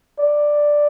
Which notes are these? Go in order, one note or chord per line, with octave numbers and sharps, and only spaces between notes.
D5